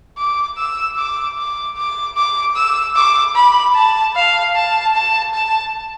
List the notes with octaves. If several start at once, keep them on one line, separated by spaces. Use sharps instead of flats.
D6
E6
D6
D6
D6
D6
E6
D6
B5
A5
F5
A5
A5
A5